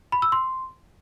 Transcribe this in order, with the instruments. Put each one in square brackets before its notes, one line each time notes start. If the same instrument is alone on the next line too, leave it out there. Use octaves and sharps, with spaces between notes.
[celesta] B5
E6
C6